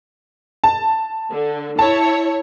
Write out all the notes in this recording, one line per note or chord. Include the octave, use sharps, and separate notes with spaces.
A5
D3
E4 C#5 A5